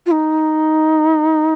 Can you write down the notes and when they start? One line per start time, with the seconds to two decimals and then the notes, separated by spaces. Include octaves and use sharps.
0.06 F4
0.11 D#4